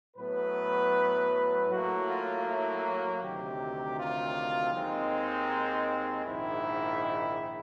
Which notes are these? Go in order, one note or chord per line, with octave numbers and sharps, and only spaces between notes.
A2 F#3 B3 B4
A2 F#3 A#3 F#4
F4
E4
F#4
D2 C3 D#3 F#3 G4
F4
D#2 D#3 G#3 C4 D#4
A#1 G#2 D#3 E4